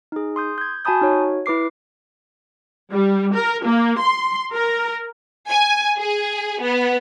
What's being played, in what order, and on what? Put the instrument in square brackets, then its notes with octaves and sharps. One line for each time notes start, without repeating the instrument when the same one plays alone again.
[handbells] D#4 G#4
C6 D#6 G6
G6 G#6
F#4 G#5 A5 B5 D#6 G6
D#4 F#4 C#5
E4 B4 D6 C7
[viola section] G3
A#4
A#3
C6
A#4
[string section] G#5
G#4
B3